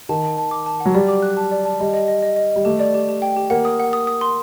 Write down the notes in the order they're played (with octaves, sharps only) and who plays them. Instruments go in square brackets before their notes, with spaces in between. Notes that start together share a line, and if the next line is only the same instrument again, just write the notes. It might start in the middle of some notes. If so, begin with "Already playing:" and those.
[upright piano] D#3 [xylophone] A5
[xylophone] A5
A5
D6
A5
F#5
[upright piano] F#3
[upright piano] G3 [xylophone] D5
[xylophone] D6
F#6
A5
D5
A5
[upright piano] G3 [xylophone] D#5
[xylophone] D#5
D#5
D#5
D#5
[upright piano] G3 [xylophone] D#5
[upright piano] A3 [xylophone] G4
[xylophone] D5
G4
G4
G5
G4
[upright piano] A#3 [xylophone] F#5
[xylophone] D#6
F#5
D#6
D#6
C6